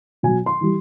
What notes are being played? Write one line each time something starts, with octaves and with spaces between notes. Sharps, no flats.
B2 F#3 G#5
C6
E3 G3